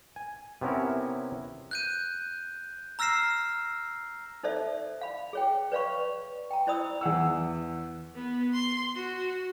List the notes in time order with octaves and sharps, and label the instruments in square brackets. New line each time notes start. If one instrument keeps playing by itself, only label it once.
[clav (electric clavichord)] G#5
C3 B3 C#4 E4 A#4
[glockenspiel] F#6 G6 D#7
A#5 E6 F6 A#6 C7 E7
[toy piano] D#4 A4 C5 D5 E5
F5 B5
G#4 C#5 G5
B4 C#5 D5 F5 B5 C#6
G5 A#5
E4 C5 D5 B5 D#6 E6
[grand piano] E2 G#4 F#5 E6
[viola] B3
C6
F#4